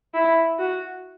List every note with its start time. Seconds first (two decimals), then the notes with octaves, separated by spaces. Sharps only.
0.14 E4
0.59 F#4